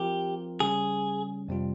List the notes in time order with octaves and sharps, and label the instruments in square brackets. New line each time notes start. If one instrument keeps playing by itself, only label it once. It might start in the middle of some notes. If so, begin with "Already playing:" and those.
Already playing: [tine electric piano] F3 C4 F4 A#4 [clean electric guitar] G4
[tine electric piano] C#3 G3 C#4 [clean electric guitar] G#4
[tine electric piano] F2 C3 G3 C4 F4